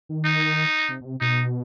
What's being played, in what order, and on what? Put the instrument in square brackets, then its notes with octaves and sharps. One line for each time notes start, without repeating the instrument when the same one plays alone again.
[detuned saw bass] D#3
[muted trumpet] D#4
[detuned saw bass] C3
B2
C3
[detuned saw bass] B2 [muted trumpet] D#4